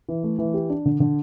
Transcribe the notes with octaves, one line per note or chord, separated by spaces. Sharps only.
E3
A3
E3
G4
D4
D3
D3